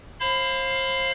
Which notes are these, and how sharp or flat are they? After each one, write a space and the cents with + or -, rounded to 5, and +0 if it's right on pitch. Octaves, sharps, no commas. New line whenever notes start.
C5 +35 F5 +0 B5 +30